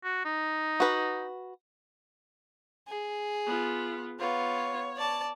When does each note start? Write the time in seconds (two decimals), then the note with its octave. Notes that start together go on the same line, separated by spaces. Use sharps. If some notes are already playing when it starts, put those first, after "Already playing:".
0.05 F#4
0.25 D#4
0.80 F#4 B4
2.88 G#4
3.47 B3 F4
4.20 B3 F4 C#5
4.97 D5 A5